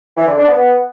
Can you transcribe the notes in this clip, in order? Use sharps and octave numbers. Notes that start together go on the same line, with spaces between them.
E3
D3
D4
B3